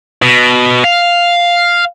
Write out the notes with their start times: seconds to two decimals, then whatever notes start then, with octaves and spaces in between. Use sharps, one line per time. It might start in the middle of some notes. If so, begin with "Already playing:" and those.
0.22 B2
0.84 F5